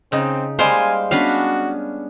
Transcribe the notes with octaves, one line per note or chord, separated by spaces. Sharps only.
C#3 C4 D#4
G3 G#3 A#3 C5 F5 G5 G#5
B3 C#4 D4 F#4 B4 F5